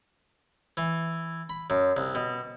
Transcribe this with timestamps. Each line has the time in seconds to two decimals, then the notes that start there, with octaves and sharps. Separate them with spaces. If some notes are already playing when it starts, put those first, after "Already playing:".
0.77 E3
1.49 B5
1.70 F#2
1.97 C2
2.15 B2